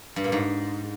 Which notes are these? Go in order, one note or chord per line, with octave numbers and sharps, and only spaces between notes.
G2
A#2
G#2